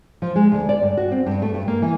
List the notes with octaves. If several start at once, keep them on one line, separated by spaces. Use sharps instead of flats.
F3
G#3
D2
D5
G2
F#4
C4
G2
A3
G2
A#3
E3